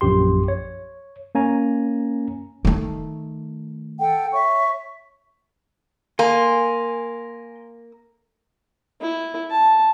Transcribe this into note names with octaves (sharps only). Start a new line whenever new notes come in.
A#1 F#2 G4 C6
C#5
A#3 C#4 G#5 A#5
D#3 A3
A4 F#5 G5
C#5 E5 C#6
A#3 G#5 C6
E4
A5